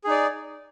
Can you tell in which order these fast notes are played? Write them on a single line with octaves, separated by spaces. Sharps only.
G#4 D#4 D5